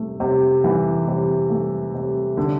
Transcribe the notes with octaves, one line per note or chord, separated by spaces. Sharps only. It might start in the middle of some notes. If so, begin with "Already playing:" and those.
Already playing: C3 A3
C3
E3
C3
A3
C3
D3